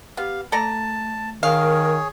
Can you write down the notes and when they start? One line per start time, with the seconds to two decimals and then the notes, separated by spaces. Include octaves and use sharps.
0.17 B3 G4 F5
0.52 A3 A4 D5 A5 A#5
1.43 D#3 G#4 A#4 C#5 F5